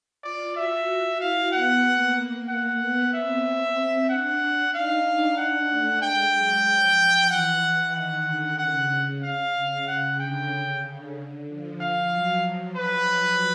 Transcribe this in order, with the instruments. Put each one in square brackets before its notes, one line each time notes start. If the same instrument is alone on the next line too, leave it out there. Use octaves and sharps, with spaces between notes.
[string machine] F4 [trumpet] D5
[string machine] F#4 [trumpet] E5
[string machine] E4 [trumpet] F5
[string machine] B3 [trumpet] F#5
[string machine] A#3
[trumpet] F#5
[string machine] B3
[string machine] C4 [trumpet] E5
[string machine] D4 [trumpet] F#5
[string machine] D#4 [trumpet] F5
[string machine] D4
[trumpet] F#5
[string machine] A3
[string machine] G#3 [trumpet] G5
[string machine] F#3
F3
[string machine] E3 [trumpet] F#5
[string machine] E3
[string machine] D#3 [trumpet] F#5
[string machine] D3
[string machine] C#3 [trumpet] F#5
[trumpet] F5
[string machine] C#3
[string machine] C#3 [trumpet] F#5
[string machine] D3 [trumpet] G5
[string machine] C#3
D3
F3
[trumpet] F5
[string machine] F#3
[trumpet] B4